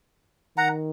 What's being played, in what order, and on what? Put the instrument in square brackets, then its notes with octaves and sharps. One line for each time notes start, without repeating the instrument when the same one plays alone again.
[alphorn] D#3 [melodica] F#5 A#5